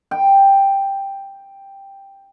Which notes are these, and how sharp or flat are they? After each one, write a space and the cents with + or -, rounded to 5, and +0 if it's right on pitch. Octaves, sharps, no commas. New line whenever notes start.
G5 +5